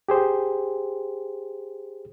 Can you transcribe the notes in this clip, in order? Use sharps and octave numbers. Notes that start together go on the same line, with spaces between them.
G4 G#4 C5